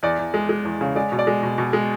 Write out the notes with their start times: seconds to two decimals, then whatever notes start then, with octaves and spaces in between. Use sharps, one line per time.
0.03 E2 D5
0.19 E2
0.34 G#3
0.49 G#3
0.65 E2
0.81 C#3
0.96 G#3 D5
1.12 B2
1.19 D5
1.27 G#3
1.43 B2
1.58 B2
1.73 G#3